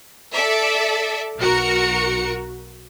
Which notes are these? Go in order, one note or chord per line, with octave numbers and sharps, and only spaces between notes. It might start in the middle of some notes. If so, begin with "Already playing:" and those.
A4 D5 E5
B1 F#4 A#4 C#7